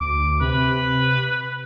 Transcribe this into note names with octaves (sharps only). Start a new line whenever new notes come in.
D2 D6
C3 B4